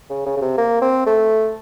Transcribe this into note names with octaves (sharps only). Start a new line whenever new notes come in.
C#3
C#3
C#3
C3
A#3
C4
A3